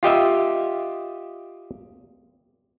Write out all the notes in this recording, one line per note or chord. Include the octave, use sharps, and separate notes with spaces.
F4 G4 D#5 E5